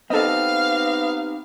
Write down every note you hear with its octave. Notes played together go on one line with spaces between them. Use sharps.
B3 C4 D#4 G4 A4 D#5 F5